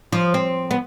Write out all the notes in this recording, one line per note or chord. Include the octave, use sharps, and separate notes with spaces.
F3
C4
B3